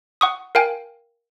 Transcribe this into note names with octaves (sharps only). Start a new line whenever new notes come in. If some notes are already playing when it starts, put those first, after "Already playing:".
F#5 C#6 D#6
A#4 F5 G5 G#5